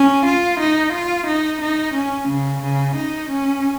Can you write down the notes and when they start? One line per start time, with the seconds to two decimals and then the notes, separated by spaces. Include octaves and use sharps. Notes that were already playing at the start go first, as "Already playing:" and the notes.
Already playing: C#4
0.26 F4
0.60 D#4
0.93 F4
1.26 D#4
1.61 D#4
1.94 C#4
2.28 C#3
2.62 C#3
2.96 D#4
3.30 C#4